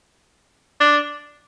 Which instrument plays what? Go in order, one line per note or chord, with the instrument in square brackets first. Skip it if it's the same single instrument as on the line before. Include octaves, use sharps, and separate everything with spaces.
[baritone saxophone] D4